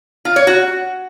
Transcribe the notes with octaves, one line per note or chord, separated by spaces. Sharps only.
F4
C#5
F#4